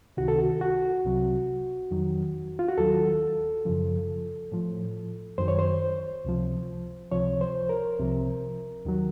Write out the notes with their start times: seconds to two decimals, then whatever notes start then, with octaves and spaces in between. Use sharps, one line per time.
0.17 C#2 C3 D#3 F#4
0.28 A4
0.38 F#4
0.61 F#4
1.05 C2 C3 F#3
1.91 F2 D#3 F#3
2.59 F4
2.68 F#4
2.78 D#2 D#3 F#3 A4
3.65 F#2 C#3 F3
4.52 A2 F3
5.38 F#2 D#3 F#3 C5
5.48 C#5
5.59 C5
6.25 C#2 C3 F3
7.12 C#2 C3 F3 C#5
7.41 C5
7.69 A#4
7.99 C2 C3 F3
8.85 D#2 D#3 F#3